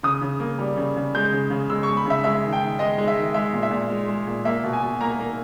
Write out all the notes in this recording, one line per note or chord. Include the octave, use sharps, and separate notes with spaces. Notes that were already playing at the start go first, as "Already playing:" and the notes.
C#3 D#6
C#3
A#3
G3
C#3
C#3
G#3 G6
C#3
C#3
G#3 E6
C#6
G#3
B5
C#3 E5
G#3 E5
D#3
G5
D#3
G#3 D#5
G#3
E5
D#3
G#3 E5
A#2
E5
A#2
G#3
G#3
A#2
A#3 E5
B2
G#5
B2
A#3 A#5
A#3